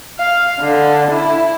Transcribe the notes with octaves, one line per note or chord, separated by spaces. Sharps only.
F5
D3
E4